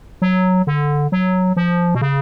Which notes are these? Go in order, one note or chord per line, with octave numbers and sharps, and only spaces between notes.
F#3
D3
F#3
F3
B2
C#3